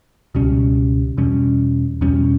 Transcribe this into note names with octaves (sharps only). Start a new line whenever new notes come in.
C#2 B2 G3 C#4
E2 B2 G3 C#4
E2 B2 G3 C#4